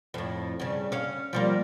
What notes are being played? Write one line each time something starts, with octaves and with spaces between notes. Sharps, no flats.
F2 A2
G2 C#3
C#4 F5
F3 G3 A#3